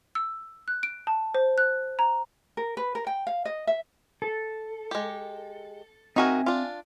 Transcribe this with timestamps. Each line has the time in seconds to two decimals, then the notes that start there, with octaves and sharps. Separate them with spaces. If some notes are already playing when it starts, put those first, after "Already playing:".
0.15 E6
0.68 F#6
0.83 D7
1.07 A5
1.35 C5
1.58 F#6
1.99 A#5
2.57 A#4
2.77 B4
2.95 A#4
3.07 G5
3.27 F5
3.45 D#5
3.67 E5
4.22 A4
4.91 G#3 G4
6.16 C4 D#4 F#4 A#4 E5 G#5
6.46 D4 F4